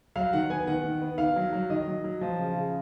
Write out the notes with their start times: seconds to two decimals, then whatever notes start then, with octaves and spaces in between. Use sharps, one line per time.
0.16 F#3 F5
0.33 D#3 F#5
0.50 B3 G#5
0.67 D#3 F#5
0.84 D#3
1.02 B3
1.18 D#3 F5
1.36 F#3
1.53 F#3
1.70 D#3 D#5
1.87 F#3
2.04 F#3
2.21 F3
2.38 C#3
2.55 C#3